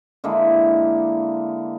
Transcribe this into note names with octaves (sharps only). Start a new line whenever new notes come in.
D3 G#3 A#3 E4